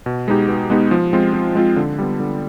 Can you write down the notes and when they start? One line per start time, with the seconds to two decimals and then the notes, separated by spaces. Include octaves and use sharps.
0.06 B2
0.28 G#3 B3 D#4 G4
0.49 B2
0.70 G#3 B3 D#4 G4
0.91 F3
1.13 G#3 C4 F4
1.34 F3
1.55 G#3 C4 F4
1.77 D3
1.98 G3 B3
2.20 D3